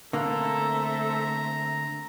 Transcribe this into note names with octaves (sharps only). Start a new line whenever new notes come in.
D3 A3 A#3 C4 A4 E5 A#5